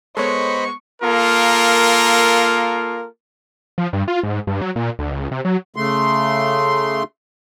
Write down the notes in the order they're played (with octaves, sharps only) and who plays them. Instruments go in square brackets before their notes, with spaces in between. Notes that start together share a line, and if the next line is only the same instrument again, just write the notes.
[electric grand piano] G#3 B3 [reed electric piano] A4 C#5 [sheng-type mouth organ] C5 D#5 B5 [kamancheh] C#6
[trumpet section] A#3 F4 A4 A#4
[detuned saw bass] F3
G2
F4
G#2
G2
F#3
A#2
D2
C#2
C3
F#3
[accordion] C#3 A3 C6